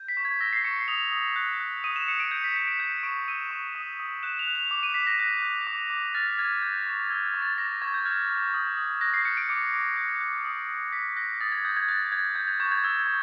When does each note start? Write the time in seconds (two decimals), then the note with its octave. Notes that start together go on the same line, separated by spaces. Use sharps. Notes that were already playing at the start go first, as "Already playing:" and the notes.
Already playing: G6
0.08 B6
0.17 C#6
0.25 G#6
0.40 E6 A#6
0.53 C7
0.64 C#6 C#7
0.76 C7
0.88 D#6 F7
1.12 D#6
1.36 F#6
1.60 F#6
1.84 D#6 D#7
1.96 E7
2.08 D#6 C#7
2.20 D7
2.31 G6 C#7
2.44 B6
2.56 G6 C#7
2.68 D7
2.80 G6 C#7
3.03 C#6 D7
3.28 E6 D#7
3.51 C#6
3.75 D#6
4.00 D#6
4.23 F#6 E7
4.39 F7
4.47 F#6
4.55 F7
4.71 D6
4.83 D#7
4.94 D6 B6
5.07 A#6
5.19 F#6
5.42 F#6
5.67 D6
5.90 D6
6.14 F6 A6
6.38 F6 G#6
6.62 G6
6.86 C#6
7.10 E6 G#6
7.26 G#6
7.34 C#6
7.42 A6
7.58 C#6 A#6
7.82 C#6 G#6
7.94 G6
8.05 F6 G#6
8.30 F6
8.54 D#6
8.77 D#6
9.01 F#6 A#6
9.14 C7
9.25 F#6 C#7
9.37 D7
9.49 D6 C#7
9.73 D6
9.97 F#6
10.20 F#6
10.44 D#6
10.69 D#6
10.92 F#6 B6
11.16 F#6 A#6
11.41 D#6 A6
11.52 G#6
11.65 D#6 G6
11.77 G#6
11.88 F#6 A6
12.12 F#6 G#6
12.35 G6
12.48 G#6
12.60 C#6 G6
12.71 G#6
12.84 E6 G#6
13.00 G#6
13.07 C#6